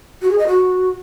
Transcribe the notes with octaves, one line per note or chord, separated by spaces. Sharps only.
F#4
G#4
D#5
F#4